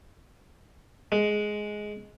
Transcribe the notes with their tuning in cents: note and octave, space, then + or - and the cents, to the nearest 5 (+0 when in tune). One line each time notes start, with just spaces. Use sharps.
G#3 +10